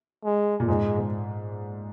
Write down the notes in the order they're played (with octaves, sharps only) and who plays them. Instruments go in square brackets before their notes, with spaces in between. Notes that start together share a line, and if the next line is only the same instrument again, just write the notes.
[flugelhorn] G#3
[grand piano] A#2
[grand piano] G#2 [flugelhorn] G#3
[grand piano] G#2